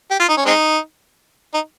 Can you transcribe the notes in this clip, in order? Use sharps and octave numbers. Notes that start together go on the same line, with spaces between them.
G4
F4
D#4
C#4
G#3 C4 D#4
D#4